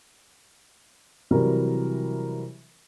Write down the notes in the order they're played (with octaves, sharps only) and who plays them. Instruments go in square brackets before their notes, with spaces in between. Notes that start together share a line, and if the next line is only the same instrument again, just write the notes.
[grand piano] C3 E3 F#3 G3 A#4